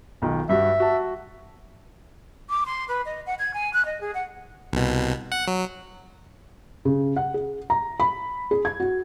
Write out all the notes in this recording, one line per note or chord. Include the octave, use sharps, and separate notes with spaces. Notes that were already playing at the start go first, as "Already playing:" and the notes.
B1 D#3 F4
G2 G3 F#4 E5
F#4 A5
D6
C6
B4
D#5
F#5
G#6
G#5
F#6
D#5
G#4
F#5
C2 B2
F#5
F#3
C#3
F#5
G#4
A#5
B5
G#4
G#6
F#4